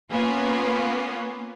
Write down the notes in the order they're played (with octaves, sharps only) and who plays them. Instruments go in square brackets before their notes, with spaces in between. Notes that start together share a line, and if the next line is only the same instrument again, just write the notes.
[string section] A#3 B3 C#4 F4